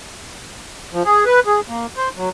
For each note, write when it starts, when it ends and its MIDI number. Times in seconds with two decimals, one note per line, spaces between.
0.93 1.03 53
1.05 1.24 68
1.26 1.40 71
1.46 1.60 68
1.69 1.86 58
1.97 2.09 72
2.17 2.29 54